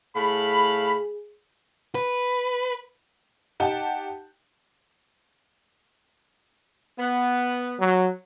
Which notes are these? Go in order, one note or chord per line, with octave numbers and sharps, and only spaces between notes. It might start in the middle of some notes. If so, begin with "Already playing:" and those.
A2 G#4 F5 B5
B4
D#4 G4 F#5 G5 A5
B3
F#3